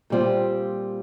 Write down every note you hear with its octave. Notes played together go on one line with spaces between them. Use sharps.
A#2 G3 C4 F4